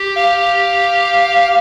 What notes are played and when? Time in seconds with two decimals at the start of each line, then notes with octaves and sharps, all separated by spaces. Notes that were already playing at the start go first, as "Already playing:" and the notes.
Already playing: G4
0.17 F5